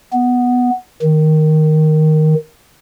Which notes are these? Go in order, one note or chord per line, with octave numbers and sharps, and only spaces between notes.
B3
D#3